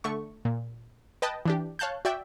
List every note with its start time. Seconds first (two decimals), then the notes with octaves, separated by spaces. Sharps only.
0.04 D3 A3 C#6
0.45 A#2
1.22 B4 D#5 G5 A5
1.45 E3 D4 G4
1.79 C#5 F5 A5 F#6 G6
2.05 F#4 D5 E5 G5